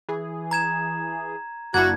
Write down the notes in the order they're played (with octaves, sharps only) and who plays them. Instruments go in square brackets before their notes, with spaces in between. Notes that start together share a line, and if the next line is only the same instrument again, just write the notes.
[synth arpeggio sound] E3 G#4
[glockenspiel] A#5 G#6 E7
[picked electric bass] F#1 [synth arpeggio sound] A#3 D4 E4 [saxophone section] F#4 [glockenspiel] G#6